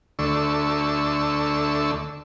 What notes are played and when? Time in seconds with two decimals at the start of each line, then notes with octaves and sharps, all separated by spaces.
0.19 D2 D3 A3 C#6 E6